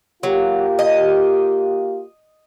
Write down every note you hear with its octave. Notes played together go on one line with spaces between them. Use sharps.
F#3 A#3 F4 G4
D#5